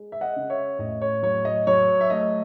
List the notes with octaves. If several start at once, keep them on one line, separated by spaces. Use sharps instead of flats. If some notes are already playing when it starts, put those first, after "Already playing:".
Already playing: G#3
E5
D#5 F#5
C#3
C#5 E5
A2 D#5
C#5
F#3 C#5
D#5
F#3 C#5
E5
A3 D#5